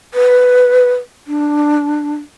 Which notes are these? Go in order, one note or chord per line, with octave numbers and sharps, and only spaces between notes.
B4
D4